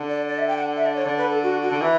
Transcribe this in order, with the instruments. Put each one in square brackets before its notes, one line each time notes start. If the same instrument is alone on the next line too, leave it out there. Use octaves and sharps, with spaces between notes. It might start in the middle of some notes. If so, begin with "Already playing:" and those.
Already playing: [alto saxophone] D3
[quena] D5
D5
E5
G5
F#5
E5
D5
C#5
[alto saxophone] D3 [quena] D5
[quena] B4
A4
F#4
F#4
[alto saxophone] D3
[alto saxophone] E3 [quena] E5